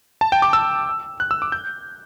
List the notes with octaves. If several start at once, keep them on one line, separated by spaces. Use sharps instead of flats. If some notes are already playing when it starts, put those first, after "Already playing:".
A5
G5
D6
E6
F#6
E6
D6
G6